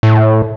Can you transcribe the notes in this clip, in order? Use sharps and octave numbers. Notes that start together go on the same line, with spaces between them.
A2